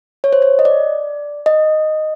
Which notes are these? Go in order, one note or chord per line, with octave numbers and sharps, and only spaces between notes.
C#5
C5
C#5
D#5
D5
D#5